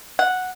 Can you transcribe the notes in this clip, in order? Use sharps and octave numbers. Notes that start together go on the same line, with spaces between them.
F#5